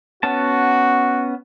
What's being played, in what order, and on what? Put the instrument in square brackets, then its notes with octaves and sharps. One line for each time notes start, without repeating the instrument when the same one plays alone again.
[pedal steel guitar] B3 C#4 A5 [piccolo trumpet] F#4